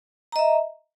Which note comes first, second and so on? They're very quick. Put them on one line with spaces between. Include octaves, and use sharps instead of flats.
A#5 D#5 E5